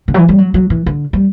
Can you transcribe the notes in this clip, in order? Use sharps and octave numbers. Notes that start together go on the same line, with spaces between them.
D3
F#3
E3
G3
F#3
F#3
E3
D3
G3